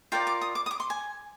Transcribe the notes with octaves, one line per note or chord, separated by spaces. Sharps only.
F4 A#4 D5 G5
D6
D#6
D6
D#6
D6
C6
G#5